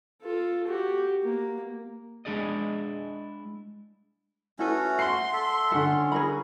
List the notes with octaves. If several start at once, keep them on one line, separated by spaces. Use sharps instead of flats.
F4 A4
F#4 G4
A#3
G#3 D4 E4 G#4 D5 D#5
A3 C#4 E4 F#4 A4 B4
F#5 C6 C7
A4 E5
D3 C#4 A4 F#5
G#4 A#4 B5